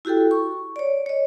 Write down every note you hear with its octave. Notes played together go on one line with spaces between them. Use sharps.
E4 F#4 G4 A4 G5
C#6
C#5 D5
C#5 D#5